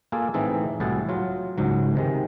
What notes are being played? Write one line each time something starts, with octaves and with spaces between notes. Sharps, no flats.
A#3 F4 G#4 A4 G#5
A2 E3 C4 D#4 G#4 A4
C2 A2 E4 F#4 G#4 A5
F#3 F4
C#2 G#2 F#3
C3 D#3 G#3